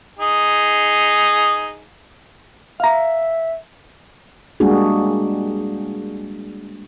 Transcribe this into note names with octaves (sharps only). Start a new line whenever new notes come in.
D#4 G#4
E5 F5 A#5
G3 G#3 A#3 D4 F#4 G#4